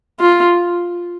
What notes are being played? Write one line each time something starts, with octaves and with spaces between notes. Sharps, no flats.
F4